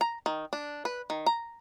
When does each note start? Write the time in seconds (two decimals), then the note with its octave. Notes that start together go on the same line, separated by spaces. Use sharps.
0.01 A#5
0.26 D#3
0.53 D4
0.85 B4
1.10 D#3
1.26 A#5